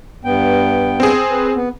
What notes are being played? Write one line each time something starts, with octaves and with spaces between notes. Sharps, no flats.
G2 B3 G5
C4 G#4
B4
B3